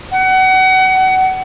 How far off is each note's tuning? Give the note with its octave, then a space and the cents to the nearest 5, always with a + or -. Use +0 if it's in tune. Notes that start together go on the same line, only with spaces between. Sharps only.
F#5 +30